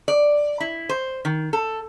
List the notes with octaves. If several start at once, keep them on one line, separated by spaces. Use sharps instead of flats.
D5
E4
C5
D#3
A4